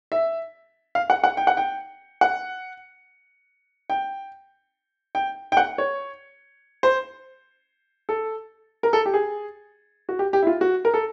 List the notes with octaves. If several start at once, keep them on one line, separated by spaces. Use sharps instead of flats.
E5
F5
F#5
F#5
G5
F#5
G5
F#5
G5
G5
G5
F#5
C#5
C5
A4
A#4
A4
G4
G#4
F#4
G4
G4
E4
F4
F#4
A#4
A4